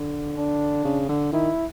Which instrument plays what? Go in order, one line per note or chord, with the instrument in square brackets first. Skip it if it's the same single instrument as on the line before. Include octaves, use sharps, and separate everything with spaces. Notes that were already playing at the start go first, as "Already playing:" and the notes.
Already playing: [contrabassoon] D3
[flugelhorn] D4
[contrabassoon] C#3
D3
[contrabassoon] D#3 [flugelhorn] E4